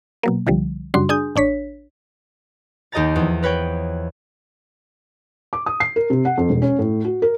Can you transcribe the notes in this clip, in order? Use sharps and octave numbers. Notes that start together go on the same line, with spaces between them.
B2 F#3 A#3
C2 D3 F3 G3
F#2 C#3 G3 D4 F#4 C6
D4 G#4 G#5 D#6 G6
A1 D4 C#5 B6
D#2 G4 D#5 A5 A#5 A6
E2 F3
A#4 B4 C#5 G5
D6
D#6
C7
A#4
C3
F#5
F2
E1
C#4
A2
F#4
A#4